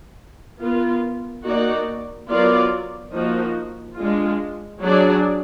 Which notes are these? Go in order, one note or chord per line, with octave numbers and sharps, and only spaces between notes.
B3 F4 A#4
A#3 D#4 F#4 D5
F#3 B3 F4 A#4 D5
F3 A#3 D#4 F#4
G#3 D4 F4
F#3 D4 G#4 D5